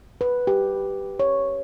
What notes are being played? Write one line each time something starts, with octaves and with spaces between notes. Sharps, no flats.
B4
G4
C#5